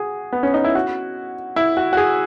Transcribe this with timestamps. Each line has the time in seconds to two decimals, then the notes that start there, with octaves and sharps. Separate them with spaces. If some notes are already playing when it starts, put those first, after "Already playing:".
Already playing: F#4 G#4
0.33 B3
0.43 C#4
0.54 D#4
0.64 E4
0.75 F#4
1.56 E4
1.77 F#4
1.93 F#4
1.97 G#4